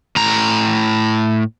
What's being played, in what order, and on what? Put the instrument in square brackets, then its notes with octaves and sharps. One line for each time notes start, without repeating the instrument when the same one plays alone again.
[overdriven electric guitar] A2 A#5